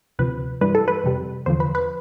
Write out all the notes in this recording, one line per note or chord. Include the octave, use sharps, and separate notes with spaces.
D2 C3 F3 B4
G2 E3 G3 B4
A4
B4
F2 C3 G3
E2 D3 F3 C5
B4
B4